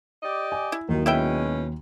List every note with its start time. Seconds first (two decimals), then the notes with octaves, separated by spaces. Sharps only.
0.23 G4 D5 D#5
0.52 G#5
0.72 E4
0.89 D#2 D#3 F#3
1.06 B2 G#3 C#4 E4 E5 G5